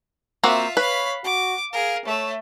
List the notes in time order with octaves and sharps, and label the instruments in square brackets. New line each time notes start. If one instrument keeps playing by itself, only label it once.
[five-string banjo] A#3 C4 F#4 [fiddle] F4 E5
[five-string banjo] B4 [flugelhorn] C#5 [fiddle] F5 B5
[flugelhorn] F#4 [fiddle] D6
[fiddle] G#4 A#4 [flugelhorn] F5
[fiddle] A3 E5 [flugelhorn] C#5